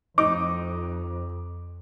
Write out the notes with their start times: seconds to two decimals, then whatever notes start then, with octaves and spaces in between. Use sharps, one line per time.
0.18 F2 D#4 D6